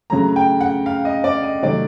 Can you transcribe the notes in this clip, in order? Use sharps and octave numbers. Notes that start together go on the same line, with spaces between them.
C#3 F#3 A3 A#5
G5
F#5
F5
D#5
D5
D#5
C3 D#3 F#3 A3 D5